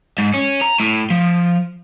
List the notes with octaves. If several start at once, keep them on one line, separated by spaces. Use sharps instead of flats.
G#2
C#4
A#5
A2
F3